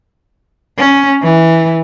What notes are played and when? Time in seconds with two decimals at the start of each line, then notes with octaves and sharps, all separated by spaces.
0.78 C#4
1.23 E3